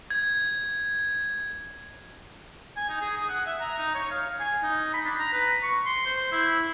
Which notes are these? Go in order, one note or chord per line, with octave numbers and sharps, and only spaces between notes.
G#6
G#5
D#4
G#4
D#6
F#5
E5
A#5
D#4
C#5
F5
G#5
D#4
B5
D4
A#5
B4
C#6
C6
C5
E4